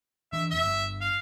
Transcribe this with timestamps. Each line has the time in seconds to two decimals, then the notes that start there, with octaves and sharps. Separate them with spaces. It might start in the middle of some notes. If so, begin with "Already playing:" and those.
0.33 E3 D4 E5
0.51 F1 F2 E5
0.64 G1
1.01 F5